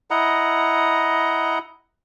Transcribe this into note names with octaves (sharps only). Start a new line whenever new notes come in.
E4 D#5 F#5 A#5